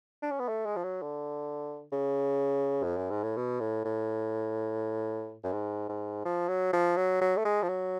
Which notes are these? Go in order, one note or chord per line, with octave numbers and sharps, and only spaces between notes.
D4
C#4
B3
A3
G#3
F3
F#3
D3
C#3
F2
F#2
G#2
A2
B2
A2
A2
F#2
G#2
G#2
F3
F#3
F3
F#3
F#3
A3
G#3
F3
F#3